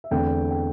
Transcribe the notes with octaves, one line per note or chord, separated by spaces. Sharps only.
E5
E2 D3 A3 C4 G5
G5